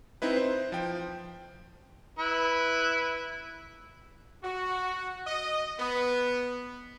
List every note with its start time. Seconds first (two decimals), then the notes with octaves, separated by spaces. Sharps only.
0.22 C4 D#4 E4 B4
0.36 C5
0.72 F3 G5
2.19 E4 B4
4.44 F#4
5.27 D#5
5.79 B3